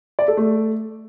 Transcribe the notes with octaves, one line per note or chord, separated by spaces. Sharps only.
D5
A4
A3